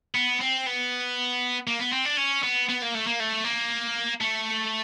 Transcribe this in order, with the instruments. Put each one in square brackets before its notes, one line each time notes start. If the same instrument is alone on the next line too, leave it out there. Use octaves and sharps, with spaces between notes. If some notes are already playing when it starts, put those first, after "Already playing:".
[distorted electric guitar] B3
C4
B3
A#3
B3
C4
D4
C#4
B3
B3
A#3
A3
A#3
A3
A#3
A3